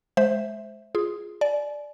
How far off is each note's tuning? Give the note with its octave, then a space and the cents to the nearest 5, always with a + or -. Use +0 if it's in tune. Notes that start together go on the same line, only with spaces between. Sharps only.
G#3 +25 C5 +0 E5 +0
F4 +0 G#4 +0
D5 +0 G#5 +40